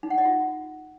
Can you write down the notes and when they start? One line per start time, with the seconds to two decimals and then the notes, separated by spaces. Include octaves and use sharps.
0.03 D#4
0.10 F#5
0.18 D#5
0.25 F4